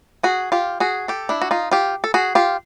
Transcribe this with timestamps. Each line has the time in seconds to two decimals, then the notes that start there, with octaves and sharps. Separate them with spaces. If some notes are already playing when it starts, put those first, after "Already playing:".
0.23 F#4 G#4
0.52 F4 G4
0.80 F#4 G#4
1.08 G4 A4
1.29 D4 E4
1.42 F#4
1.51 D#4 F4
1.71 F4 G4
2.04 A4
2.14 F#4 G#4
2.35 F4 G4